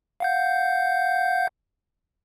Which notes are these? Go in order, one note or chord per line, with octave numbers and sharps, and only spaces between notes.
F5 F#5 G6